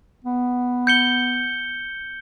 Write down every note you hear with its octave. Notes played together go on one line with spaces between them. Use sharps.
B3
G6 C#7 G7